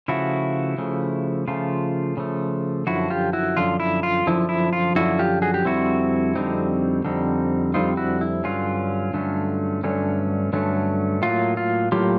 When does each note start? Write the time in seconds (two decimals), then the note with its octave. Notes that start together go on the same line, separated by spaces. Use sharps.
0.08 C#3 F3 A3 E4 F#4
0.78 C#3 F3 A3
1.48 C#3 F3 A3 F4
2.17 C#3 F3 A3
2.87 F#2 D3 F3 E4 F#4
3.10 F4 G4
3.33 E4 F#4
3.57 F#2 D3 F3 F4
3.80 E4
4.03 F4
4.26 F#2 D3 F3 E4
4.49 E4
4.73 F4
4.95 F#2 D3 F3 E4 F#4
5.19 F4 G4
5.42 F#4 G#4
5.54 G4
5.65 F2 D3 G3 C4 E4 F#4
6.35 F2 D3 G3 C4 D#4
7.05 F2 D3 G3 C4 D#4
7.74 F2 D3 G3 C4 D#4 F4
7.97 E4 F#4
8.21 E4
8.44 G2 D3 F#3 C#4 F4
9.13 G2 D3 F#3 A3 C#4
9.83 G2 D3 F#3 A3 C#4
10.53 G2 D3 F#3 A3 C#4
11.22 A2 F#3 A#3 F4
11.57 F4
11.92 A2 F#3 A#3 F4 G4